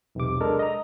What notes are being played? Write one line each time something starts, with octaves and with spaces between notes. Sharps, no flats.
B1 E2 C3 D6
G#3 D4 A4 A#4
D#5 A#5